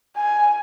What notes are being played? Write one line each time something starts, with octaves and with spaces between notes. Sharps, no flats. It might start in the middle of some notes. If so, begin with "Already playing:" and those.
G#5